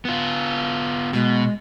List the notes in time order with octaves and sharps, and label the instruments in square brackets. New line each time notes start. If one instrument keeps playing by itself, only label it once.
[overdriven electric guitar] B3 F4
[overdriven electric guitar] B2 [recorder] G#3